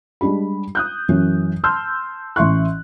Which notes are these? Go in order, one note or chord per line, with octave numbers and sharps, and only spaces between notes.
G3 G#3 D4 G4 B5
D#6 F#6 G6
F#2 E3 F#3 C#4
A5 C6 E6 F6 G6
A1 E3 E5 C6 C#6 F#6